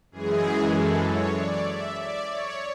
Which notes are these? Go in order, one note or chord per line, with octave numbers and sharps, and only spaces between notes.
F#2 E3 G#3 G#4
A4
C#5
D5
E5
D5
C#5